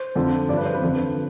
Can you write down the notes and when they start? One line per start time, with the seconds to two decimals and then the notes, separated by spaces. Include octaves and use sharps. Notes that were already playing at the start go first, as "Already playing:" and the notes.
Already playing: C5
0.15 F2 D3 F3
0.49 G2 D5
0.52 F3 B4
0.65 C5
0.74 B4
0.82 F2 D3 F3